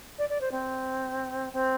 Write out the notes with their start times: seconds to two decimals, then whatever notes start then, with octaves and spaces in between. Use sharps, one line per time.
0.19 D5
0.29 D5
0.41 C5
0.52 C4
1.53 C4